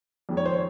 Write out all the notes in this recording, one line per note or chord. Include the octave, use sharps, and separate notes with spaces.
F2 D#3 G#3
C#5
C5
C#5